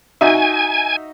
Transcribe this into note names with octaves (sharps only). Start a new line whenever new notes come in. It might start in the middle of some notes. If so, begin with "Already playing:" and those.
D#4 F#4 E5 G#5